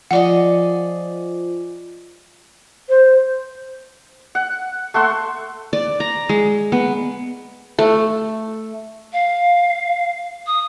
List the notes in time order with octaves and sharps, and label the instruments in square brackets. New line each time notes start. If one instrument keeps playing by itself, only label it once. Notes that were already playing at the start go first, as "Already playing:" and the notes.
[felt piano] F3 [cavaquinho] G#4 D5 D#5 [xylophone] F#5
[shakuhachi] C5
[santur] F#5
A3 F#5 C6 E6
[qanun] D5
A#5
G#3
B3
A3
[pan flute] F5
D#6